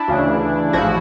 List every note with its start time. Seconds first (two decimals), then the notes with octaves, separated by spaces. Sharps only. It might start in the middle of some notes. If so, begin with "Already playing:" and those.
Already playing: D4 E4
0.08 D2 C#3 E3
0.73 A1 G#2 F3 E4 F#4